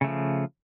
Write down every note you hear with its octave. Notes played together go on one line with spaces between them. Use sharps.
C#3 F3 A3